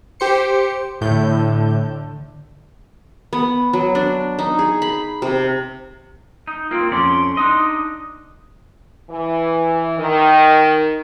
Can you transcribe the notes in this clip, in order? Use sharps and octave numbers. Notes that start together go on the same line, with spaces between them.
G4 C5 C#7
A2 D3 G6
B3
F#3
D4
D#4
G#4
B5
C3
D#4
A#3 C4 F4
F2 C#4 D5 C6
D4 D#4 D#5
E3
D#3